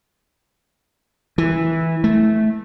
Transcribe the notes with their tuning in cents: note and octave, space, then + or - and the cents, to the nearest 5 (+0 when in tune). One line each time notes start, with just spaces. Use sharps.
E3 -10
A3 -15